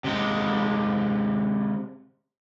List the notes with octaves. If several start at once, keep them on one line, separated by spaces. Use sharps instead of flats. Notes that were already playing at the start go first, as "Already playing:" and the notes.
C3 G#3